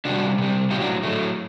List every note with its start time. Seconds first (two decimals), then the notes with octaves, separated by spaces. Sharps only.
0.05 C3 G3 D4 F#4
0.38 C3 G3
0.71 A2 F#3 D#4 G4
0.81 D4 F#4
1.03 A2 F#3 A3